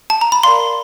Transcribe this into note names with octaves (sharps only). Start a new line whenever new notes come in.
A5
A#5
B5
A#4 D5 F5 C6